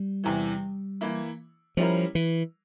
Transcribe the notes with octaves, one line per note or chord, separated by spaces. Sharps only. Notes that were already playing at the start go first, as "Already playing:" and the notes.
Already playing: G3
E2 C3 E3
E3 A#3 E4
F3 G3 C#4 E4 A#4
E3